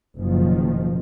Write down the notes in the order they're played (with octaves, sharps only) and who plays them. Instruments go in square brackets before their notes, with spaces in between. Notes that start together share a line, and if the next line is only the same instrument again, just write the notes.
[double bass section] F#1 B2 D#3 F3